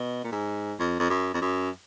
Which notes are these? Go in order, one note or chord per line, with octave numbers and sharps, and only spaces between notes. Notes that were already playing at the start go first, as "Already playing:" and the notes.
Already playing: B2
A#2
G#2
F2
F2
F#2
F2
F#2